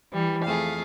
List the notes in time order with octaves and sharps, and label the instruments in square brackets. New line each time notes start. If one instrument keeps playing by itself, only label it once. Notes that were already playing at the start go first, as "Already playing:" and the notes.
[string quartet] E3 G3
[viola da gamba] F2 A3 G#4 [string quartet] F5